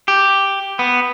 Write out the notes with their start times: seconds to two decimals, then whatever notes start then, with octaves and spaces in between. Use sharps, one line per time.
0.08 G4
0.79 B3